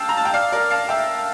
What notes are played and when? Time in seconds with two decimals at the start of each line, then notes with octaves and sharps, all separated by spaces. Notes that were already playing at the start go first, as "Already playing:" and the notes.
Already playing: F5 G5 A5 E6
0.09 A#5
0.17 A5
0.25 G5
0.34 D5 F5 F6
0.52 A#4 D5
0.70 F5 A5
0.89 E5 G5 E6